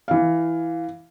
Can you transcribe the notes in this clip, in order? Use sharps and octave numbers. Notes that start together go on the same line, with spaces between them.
E3 F5